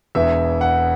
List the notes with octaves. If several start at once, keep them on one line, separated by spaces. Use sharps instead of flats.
E1 E2 E3 E5
F#5